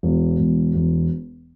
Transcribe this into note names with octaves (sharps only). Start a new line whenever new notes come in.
E1
E1
E1